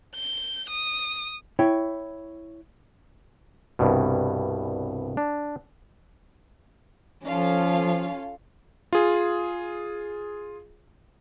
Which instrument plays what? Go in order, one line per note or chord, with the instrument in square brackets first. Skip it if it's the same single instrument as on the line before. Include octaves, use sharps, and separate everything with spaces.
[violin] G6
D#6
[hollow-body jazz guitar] E4 C#5 G5
[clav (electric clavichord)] C2 G2 B2
D4
[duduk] F3 [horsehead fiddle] C#4 [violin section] F4 A4 F5
[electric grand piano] F4 G#4